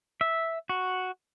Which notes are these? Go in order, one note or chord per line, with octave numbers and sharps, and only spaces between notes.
E5
F#4